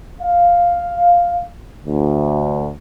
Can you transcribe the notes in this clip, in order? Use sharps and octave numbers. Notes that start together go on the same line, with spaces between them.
F5
D2